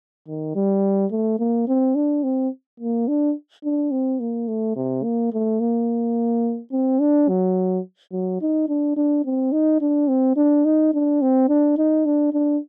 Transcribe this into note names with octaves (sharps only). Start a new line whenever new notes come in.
D#3
G3
A3
A#3
C4
D4
C4
A#3
D4
D4
C4
A#3
A3
C3
A#3
A3
A#3
C4
D4
F#3
F#3
D#4
D4
D4
C4
D#4
D4
C4
D4
D#4
D4
C4
D4
D#4
D4
D4